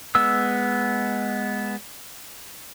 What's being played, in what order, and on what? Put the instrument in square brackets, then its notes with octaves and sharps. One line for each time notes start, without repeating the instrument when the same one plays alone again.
[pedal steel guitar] G#3 B3 E6